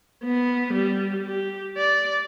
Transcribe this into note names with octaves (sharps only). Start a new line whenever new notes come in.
B3
G3
G4
D5